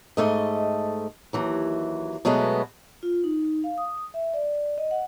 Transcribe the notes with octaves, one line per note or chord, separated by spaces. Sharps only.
G#2 A3 D#5
D#2 E3 F#3
B2 F#3 G#3 A3 B3
F4
D#4
F5
D#6
E5
D5
D#5
F#5